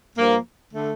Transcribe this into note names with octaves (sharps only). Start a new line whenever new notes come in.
G2 F3 A#3
D3 A3